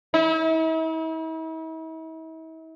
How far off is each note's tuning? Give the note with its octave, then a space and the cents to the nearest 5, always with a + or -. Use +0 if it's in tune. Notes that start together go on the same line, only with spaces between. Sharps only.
E4 -45